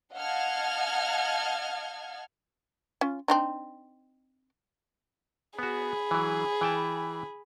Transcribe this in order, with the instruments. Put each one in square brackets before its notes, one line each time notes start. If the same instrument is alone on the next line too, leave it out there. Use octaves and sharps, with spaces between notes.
[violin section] D#5 F5 F#5 A5 F6 G#6
[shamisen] C#4 F4
C4 D4 D#4
[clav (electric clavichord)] B3 F#4 [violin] G#4 B5
[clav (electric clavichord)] E3 F#3
E3 G5 A5